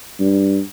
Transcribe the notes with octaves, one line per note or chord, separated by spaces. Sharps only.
G2